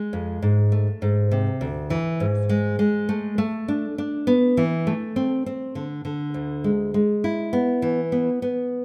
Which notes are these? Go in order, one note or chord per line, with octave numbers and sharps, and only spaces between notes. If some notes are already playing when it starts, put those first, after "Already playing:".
Already playing: G#3
F2
G#2
A3
G#2
C3
D2
E3
G#2
G#3
G#3
A3
A3
D4
D4
B3
E3
A3
C4
C4
D3
D3
D2
G#3
G#3
E4
B3
E3
B3
B3